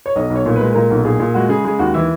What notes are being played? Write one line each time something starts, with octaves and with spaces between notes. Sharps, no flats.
C#5
B1 D#5
B1
C#5
A#2
B4
G#3
A#2 A#4
B1
A#2 G#4
A#2
G#3 F#4
C#3 G#4
G#3 G#4
D#2 F#4
E3 E4